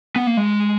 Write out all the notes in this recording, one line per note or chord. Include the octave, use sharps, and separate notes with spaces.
B3
A#3
G#3